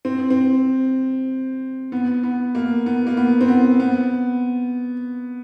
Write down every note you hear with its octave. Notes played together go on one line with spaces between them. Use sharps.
C4
C4
B3
B3
A#3
B3
A#3
B3
C4
B3
B3